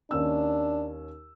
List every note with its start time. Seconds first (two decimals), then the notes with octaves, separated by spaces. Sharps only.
0.11 D#2 C#4 D4 E6